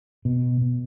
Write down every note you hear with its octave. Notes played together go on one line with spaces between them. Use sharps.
B2
B2